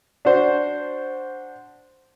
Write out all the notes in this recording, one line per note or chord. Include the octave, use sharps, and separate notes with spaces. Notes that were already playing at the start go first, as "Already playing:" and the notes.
D4 F#4 C5